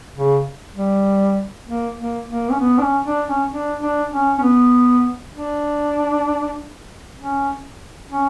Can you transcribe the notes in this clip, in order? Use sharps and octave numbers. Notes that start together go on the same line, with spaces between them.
C#3
G3
A#3
A#3
A#3
C#4
B3
D4
C#4
D4
C#4
D4
D4
C#4
C#4
B3
D4
C#4
C#4